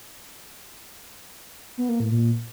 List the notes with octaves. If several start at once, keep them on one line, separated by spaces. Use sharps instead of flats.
B3
A#3
A2
A#2